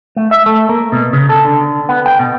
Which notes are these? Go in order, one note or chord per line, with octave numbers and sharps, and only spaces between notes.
A3
E5
A3
A#3
B2
C#3
A4
D3
B3
G5
B2